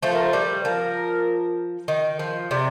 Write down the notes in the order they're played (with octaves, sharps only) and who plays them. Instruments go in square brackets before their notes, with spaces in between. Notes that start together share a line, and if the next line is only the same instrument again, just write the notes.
[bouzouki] F3 A3 [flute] C5
[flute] A#4
C5
[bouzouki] G3
[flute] C5
[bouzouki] F3 [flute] A#4
[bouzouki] D#3
F3
[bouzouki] C3 [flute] D5